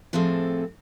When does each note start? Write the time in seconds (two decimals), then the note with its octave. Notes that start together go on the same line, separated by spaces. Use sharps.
0.13 A2 F3 C4 G#4 A4